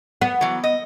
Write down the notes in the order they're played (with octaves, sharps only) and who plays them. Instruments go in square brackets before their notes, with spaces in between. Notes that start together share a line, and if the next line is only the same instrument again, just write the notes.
[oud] B3
[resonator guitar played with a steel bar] E3 F#3
D#5